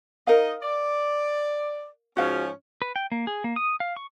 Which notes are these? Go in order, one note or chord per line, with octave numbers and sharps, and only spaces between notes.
D#4 A#4 D#5 F5
D5
G#2 F3 C#4 F#4 F5
B4
G5
A#3
G#4
A#3
D#6
F5
C#6